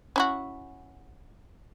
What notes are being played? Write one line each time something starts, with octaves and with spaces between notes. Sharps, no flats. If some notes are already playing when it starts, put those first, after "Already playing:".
C#4 E4 F#4